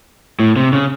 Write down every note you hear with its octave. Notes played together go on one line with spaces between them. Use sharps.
A2
C3
C#3